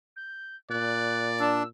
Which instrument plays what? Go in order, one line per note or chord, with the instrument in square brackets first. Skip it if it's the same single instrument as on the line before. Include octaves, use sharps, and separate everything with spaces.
[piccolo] G6
[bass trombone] A#2 [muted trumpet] D5 [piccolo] F#6
[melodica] D4 [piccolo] E6